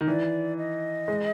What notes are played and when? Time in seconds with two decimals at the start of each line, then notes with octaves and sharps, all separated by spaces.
0.01 D#3
0.08 E3 D5
0.58 D#5
1.08 G#3